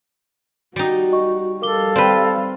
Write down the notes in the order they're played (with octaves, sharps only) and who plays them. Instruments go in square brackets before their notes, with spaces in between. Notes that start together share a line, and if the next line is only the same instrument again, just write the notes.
[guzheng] G3 D#4 [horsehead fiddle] F#4
[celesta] D#5 C#6
[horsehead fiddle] G3 F5 [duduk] A4 [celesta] A#4 D6 G7
[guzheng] C4 B4 [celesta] D5 B5